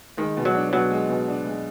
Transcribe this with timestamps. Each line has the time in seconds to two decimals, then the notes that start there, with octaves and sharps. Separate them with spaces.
0.17 D#3 G#3
0.37 B2
0.45 F#3
0.54 D4
0.73 B2 F#3
0.91 G#3
1.09 B2
1.28 D4
1.46 G#3